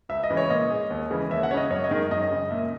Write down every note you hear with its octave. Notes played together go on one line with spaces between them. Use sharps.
C#2 E5
D#5
C#3 E3 G#3
C#5
A#2 D#5
G#3
D#2
C#3 E3 G#3
D#2 E5
F#5
C#3 G#3 C#5 D#5
F#2 C#5
D#5
D#3 G#3
F#2 D#5
C#3 G#3
A#2 E5